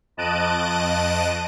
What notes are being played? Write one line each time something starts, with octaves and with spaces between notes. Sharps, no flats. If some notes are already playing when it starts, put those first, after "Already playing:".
F2 D#5 A5 F#6 D7 D#7